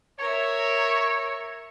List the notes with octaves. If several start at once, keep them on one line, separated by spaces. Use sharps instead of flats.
A#4 C#5 E5